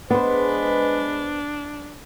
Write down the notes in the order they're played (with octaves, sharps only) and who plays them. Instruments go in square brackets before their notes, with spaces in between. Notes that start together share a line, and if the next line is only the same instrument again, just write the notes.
[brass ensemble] G#3 B4 [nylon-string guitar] B3 C5 [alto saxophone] D4